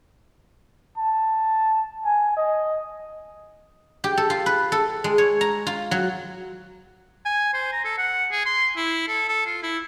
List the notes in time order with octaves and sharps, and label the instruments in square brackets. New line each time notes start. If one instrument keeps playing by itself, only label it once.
[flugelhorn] A5
G#5
D#5
[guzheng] G4
A4
F4
B4
A4
G#3
C#5
A#5
F4
F#3
[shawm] G#5
C5
A#5
A4
F#5
G#4
C6
E4
A4
A4
F4
E4